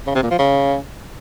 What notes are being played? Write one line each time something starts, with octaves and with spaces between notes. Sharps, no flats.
C#3
C3
A#2
F3
C#3